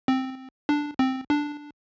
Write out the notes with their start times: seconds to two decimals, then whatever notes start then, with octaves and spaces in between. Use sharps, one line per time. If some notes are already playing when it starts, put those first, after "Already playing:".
0.08 C4
0.69 D4
0.99 C4
1.30 D4